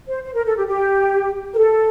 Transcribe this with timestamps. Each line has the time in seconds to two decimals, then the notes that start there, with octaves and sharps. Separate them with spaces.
0.08 C5
0.23 C5
0.34 A#4
0.45 A4
0.56 G4
0.67 G4
1.53 A#4
1.57 A4